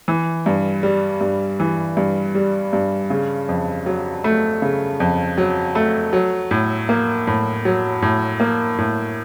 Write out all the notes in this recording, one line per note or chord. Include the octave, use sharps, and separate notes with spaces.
E3
G2
G3
G2
E3
G2
G3
G2
C#3
F2
F#3
A3
C#3
F2
F#3
A3
F#3
A2
A#3
A2
F#3
A2
A#3
A2